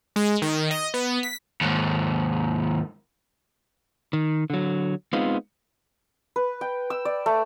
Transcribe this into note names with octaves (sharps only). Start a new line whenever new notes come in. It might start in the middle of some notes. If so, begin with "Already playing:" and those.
G#3
D#3
D#5
B3
B6
D#2 G#2
D#3
D3 F#3
G#3 B3 C4 D#4 F4
B4
G5
E6
D5
A3